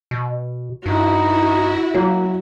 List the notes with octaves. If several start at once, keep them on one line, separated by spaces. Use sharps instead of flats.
B2
G2 D#4 E4 F#4
F#3 A#3